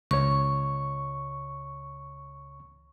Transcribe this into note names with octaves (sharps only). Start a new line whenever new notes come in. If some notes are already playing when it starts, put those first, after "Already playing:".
C#2 C#5 C#6